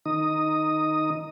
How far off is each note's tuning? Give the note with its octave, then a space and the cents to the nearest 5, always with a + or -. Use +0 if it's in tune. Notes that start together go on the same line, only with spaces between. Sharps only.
D#3 +0 D#4 +0 D#6 +0